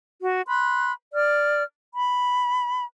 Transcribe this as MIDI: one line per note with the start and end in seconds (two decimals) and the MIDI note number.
0.21 0.41 66
0.47 0.93 83
0.47 0.93 84
0.47 0.93 90
1.13 1.62 74
1.13 1.62 89
1.93 2.85 83